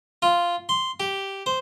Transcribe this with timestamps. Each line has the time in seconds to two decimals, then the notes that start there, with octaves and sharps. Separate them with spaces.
0.22 F4
0.69 C6
1.00 G4
1.46 C5